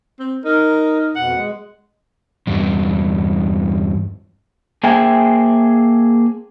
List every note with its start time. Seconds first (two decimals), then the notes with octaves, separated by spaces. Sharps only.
0.19 C4
0.45 D#4 A#4
1.15 F2 B2 F#5
1.34 G#3
2.47 E2 G2
4.83 A#3 G#4 C5 E5 G5 G#5